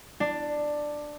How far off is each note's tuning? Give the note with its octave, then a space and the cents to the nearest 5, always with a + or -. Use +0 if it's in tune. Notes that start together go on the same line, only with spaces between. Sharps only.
D4 +10